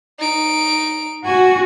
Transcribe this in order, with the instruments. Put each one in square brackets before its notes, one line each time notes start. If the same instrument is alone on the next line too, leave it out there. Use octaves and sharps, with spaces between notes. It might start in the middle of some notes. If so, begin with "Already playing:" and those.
[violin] D#4 D7
[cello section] F#4 [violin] G#5